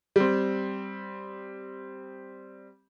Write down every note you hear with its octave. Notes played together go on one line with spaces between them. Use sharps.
G3 C4